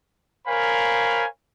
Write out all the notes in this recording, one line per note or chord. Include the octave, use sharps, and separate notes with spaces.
A#4 C5 C#5 F5 G#5 B5